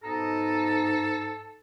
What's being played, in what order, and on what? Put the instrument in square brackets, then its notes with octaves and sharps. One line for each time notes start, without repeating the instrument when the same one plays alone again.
[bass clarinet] G#2 [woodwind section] B2 D#4 A#5 [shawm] A4